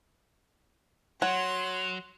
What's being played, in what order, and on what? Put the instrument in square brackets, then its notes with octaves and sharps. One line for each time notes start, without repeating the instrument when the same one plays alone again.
[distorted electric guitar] F#3 [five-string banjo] C#5 F#5 [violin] C6